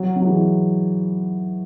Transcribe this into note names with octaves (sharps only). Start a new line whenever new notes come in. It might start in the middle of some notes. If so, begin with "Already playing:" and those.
Already playing: F#3
F#3
E3 G#3